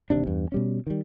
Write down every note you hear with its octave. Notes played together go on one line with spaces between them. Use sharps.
E1 D#2 C3 D4
E2 G2
B2 G3 C#4
D#3 G3